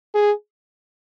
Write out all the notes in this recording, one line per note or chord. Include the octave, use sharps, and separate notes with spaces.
G#4